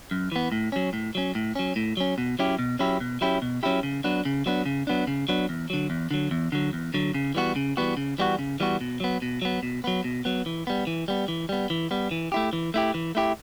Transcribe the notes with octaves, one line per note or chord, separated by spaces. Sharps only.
F#2
E3 B3
A2
F#3 C#4
A2
F#3 C#4
A2
F#3 C#4
A2
F#3 C#4
B2
F#3 C#4 E4 G4
B2
F#3 C#4 E4 G4
B2
F#3 C#4 E4 G4
B2
F#3 C#4 E4 G4
C#3
F#3 B3 D4
C#3
F#3 B3 D4
C#3
F#3 B3 D4
C#3
F#3 B3 D4
E2
D3 F#3
E2
D3 F#3
E2
D3 F#3
E2
D3 F#3
C#3
E3 G3 B3 F#4
C#3
E3 G3 B3 F#4
C#3
E3 G3 B3 F#4
C#3
E3 G3 B3 F#4
B2
F#3 B3
B2
F#3 B3
B2
F#3 B3
B2
F#3 B3
E3
G3 B3
E3
G3 B3
E3
G3 B3
E3
G3 B3
E3
A3 E4 G4
E3
A3 E4 G4
E3
A3 E4 G4